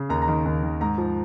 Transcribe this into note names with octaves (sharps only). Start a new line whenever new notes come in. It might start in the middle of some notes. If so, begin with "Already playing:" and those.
Already playing: C#3
D#2 A#5
A#5
D#3
D#2
D#3
G#2 A#5
F3